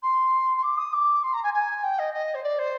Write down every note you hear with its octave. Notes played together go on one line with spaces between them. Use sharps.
C6
C6
D6
D#6
D6
C6
A#5
G#5
G#5
G5
D#5
D#5
C5
D5
C5